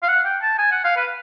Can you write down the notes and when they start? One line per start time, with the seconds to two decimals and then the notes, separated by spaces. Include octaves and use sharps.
0.03 F5
0.08 F#5
0.25 G5
0.42 A5
0.59 G#5
0.71 F#5
0.84 F5
0.97 B4